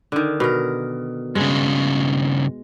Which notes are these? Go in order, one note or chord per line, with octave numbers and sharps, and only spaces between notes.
D3 D#3
B2 A#4
G2 C#3 G#3